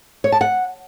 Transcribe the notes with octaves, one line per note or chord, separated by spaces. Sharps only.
C#5
A5
F#5